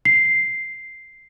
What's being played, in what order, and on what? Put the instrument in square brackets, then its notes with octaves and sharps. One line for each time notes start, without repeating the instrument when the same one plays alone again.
[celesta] C7